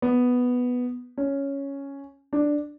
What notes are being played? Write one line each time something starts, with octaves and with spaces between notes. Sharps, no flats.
B3
C#4
D4